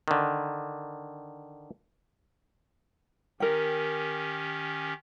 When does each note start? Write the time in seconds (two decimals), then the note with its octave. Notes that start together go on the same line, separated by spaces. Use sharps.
0.08 D3 D#3
3.40 D#3 C#4 G4 A#4 G5